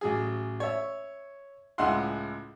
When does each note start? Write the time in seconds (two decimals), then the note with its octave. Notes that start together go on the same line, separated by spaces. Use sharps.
0.01 A1 F#3 G#4
0.60 C#5 E5
1.78 C#2 A2 G#3 E4 F#5 C6